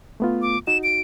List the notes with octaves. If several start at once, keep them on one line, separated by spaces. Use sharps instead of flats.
A3 B3 F4
D6
D#4 F#4 E7
D7